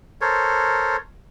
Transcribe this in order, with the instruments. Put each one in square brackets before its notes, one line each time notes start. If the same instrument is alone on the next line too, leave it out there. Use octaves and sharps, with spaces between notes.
[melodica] A4 A#4 C5 C#5